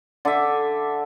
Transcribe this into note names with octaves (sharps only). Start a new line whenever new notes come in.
D3 E5